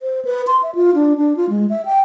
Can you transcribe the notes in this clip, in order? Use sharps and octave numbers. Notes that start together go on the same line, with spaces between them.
C5
B4
C6
E5
F4
D4
D4
F4
G#3
E5
G5